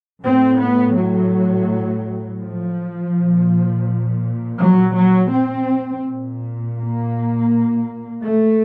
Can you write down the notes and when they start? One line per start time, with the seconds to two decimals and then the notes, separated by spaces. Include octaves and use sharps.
0.23 A2 C4
0.59 B3
0.97 F#3
2.41 F3
3.13 A#2
4.59 F#3
4.95 F#3
5.32 C4
6.04 A#2
6.78 A#3
8.22 A3